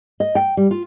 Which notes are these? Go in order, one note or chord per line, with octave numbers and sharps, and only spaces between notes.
D#5
G5
G3
F4